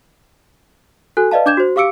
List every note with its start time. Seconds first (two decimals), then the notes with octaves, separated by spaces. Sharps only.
1.17 F#4 A4 G#5 F#6
1.31 B4 D5 D#5 F5 A5
1.46 D4 D6 G6 G#6 E7
1.57 F#4 C5
1.76 G4 F5 D6 E6 C#7 D7